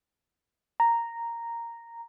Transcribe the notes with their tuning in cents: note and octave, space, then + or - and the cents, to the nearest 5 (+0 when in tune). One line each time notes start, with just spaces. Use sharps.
A#5 -5